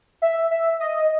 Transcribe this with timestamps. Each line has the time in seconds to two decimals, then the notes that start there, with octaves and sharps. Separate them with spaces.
0.22 E5
0.51 E5
0.80 D#5